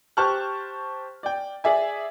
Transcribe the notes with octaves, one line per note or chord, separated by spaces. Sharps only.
G4 C5 A5 C#6 F6 F#6
D5 G5
G#4 D5 E5 G#5